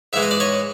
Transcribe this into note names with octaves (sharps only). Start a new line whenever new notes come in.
G#2 E3 G#3 E5
D#5
D5
C#5 D#5